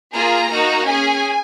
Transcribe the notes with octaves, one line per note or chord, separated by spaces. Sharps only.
A#3 F4 G#4 A#5
A#3 D#4 F#4
C#4 G#4 G#5